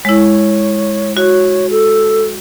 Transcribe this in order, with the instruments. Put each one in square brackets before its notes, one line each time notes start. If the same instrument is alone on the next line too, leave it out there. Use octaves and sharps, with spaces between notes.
[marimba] G#3 E4 [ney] C#5
[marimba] F#4 [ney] C#5
[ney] A4